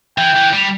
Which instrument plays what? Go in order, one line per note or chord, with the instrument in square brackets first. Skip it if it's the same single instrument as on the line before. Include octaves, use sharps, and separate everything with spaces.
[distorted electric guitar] E3 [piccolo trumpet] G5
[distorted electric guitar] E3
G3